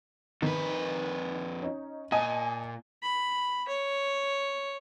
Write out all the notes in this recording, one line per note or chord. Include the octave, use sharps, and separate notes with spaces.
F2 D#3 B4
C#4 D#4
A#2 D#5 G#5 A5
B5
C#5